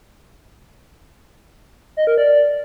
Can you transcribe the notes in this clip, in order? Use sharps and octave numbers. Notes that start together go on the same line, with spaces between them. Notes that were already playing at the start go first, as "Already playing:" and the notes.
D#5
A#4
D5